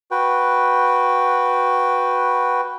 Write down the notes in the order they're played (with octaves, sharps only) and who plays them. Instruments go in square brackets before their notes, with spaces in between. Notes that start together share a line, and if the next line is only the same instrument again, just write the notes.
[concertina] F#4 B4 G5